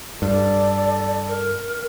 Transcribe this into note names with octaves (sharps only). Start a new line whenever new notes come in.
G2 A4 D5
A#4